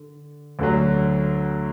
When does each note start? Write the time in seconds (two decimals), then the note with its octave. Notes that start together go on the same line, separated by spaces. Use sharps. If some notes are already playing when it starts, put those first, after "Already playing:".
Already playing: D3
0.59 D2 D3 F#3